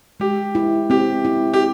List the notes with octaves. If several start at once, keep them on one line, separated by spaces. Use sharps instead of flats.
G#3 G4
E4
C4 G4
E4
G4